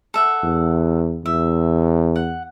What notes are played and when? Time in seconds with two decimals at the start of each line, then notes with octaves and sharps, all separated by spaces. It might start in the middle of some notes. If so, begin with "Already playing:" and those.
0.14 A4 E5 F#5
0.44 E2
1.26 E2 E5
2.16 F#5